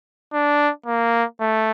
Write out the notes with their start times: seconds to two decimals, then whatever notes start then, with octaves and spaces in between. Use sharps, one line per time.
0.33 D4
0.86 A#3
1.40 A3